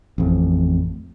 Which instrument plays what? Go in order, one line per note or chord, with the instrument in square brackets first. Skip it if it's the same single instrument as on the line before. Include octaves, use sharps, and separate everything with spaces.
[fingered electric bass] A1 F2